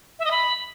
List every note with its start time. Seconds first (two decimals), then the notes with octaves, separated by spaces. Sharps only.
0.19 E5
0.25 D#5
0.31 B5